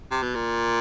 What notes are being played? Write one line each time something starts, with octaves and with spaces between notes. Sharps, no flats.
C3
B2
A#2